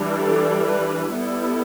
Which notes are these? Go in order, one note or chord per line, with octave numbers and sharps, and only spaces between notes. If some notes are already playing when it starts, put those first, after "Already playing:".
Already playing: E3 G3 D4
A4
B4
G3 B3 E4 A4